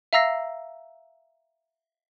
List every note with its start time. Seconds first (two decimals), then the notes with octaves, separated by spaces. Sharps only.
0.13 E5 F5 A#5 E6 A#6 C7